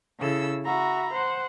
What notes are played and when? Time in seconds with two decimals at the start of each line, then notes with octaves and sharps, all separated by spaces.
0.20 C#3 E4 A4 E6
0.64 F#4 E5 A#5 B5
1.12 C5 F#5